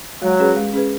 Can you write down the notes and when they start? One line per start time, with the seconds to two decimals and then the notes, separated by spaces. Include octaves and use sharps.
0.22 F#3 G#3
0.39 C#4 G#4 B4
0.56 G#3
0.73 C#4 G#4 B4